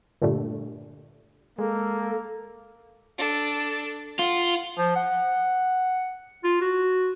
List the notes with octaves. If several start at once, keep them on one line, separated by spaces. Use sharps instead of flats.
G2 A#2 D3 G3 A3
G#3 A#3 A4
D4 A4
F4 F#5
F3
F#5
F4
F#4